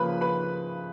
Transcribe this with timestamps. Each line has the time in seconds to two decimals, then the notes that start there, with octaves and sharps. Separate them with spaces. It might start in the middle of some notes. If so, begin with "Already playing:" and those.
Already playing: C#3 F3 A#3 B4 B5
0.21 B4 B5